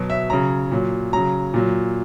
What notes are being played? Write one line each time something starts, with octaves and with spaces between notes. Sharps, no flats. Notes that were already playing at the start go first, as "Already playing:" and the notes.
Already playing: B2 F#3
E5
C#3 F#3 A#5
A#2 F#3
C#3 F#3 A#5
A#2 F#3